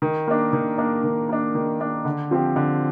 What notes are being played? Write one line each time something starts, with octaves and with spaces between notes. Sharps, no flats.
D#3
A#3 D4
D#3
A#3 D4
D#3
A#3 D4
D#3
A#3 D4
D3
F3 C4 G4
D3